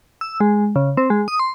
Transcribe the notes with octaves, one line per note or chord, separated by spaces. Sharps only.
E6
G#3
C#3
C4
G#3
D#6
C6